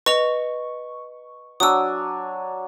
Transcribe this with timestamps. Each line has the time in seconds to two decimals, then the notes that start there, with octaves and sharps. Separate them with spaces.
0.06 B4 D#5 C#6 F7
1.60 F#3 D4 G#5 D#6 E6